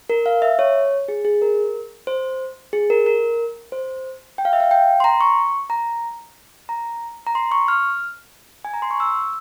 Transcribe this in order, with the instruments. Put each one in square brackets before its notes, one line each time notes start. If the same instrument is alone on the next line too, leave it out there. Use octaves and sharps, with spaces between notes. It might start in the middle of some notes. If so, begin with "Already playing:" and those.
[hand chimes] A#4
F5
E5
C#5
G#4
G#4
A#4
C5
G#4
A#4
A#4
C5
G5
F5
E5
F5
G5
C6
A#5
C#6
A#5
A#5
A#5
C6
C#6
F6
G#5
A#5
C6
C#6
E6